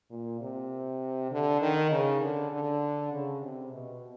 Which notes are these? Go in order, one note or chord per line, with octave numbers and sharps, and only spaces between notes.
A#2
C3
D3
D#3
C#3
D3
D3
C#3
C3
B2